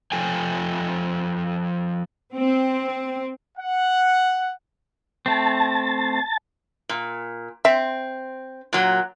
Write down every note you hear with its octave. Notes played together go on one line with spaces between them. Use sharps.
F3 F4 A4 G5 G#5
C4
F#5
A3 C4 A5
A#2
C4 E5
A#2 F#3